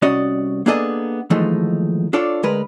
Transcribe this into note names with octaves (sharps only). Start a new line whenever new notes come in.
C2 C#4 F#4 D5 D#5
A#3 B3 D4 G#4 A4 D#5
D#2 E3 F3 G#3 A3 D#4
D4 F4 A4 C#5 D5
D2 G#3 A#4 B4